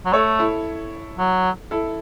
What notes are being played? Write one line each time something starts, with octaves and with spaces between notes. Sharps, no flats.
F#3
A3 A4 C#5
E4 A4
F#3
E4 A4